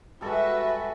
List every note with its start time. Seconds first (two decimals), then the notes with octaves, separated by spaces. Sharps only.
0.21 G3 G#3 F#4 A4 B4 E5